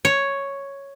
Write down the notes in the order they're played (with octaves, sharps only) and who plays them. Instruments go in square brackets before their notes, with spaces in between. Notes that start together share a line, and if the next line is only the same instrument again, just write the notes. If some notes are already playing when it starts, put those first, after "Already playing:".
[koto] C#5